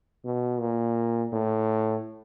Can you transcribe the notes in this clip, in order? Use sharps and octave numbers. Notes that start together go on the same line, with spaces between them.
B2
A#2
A2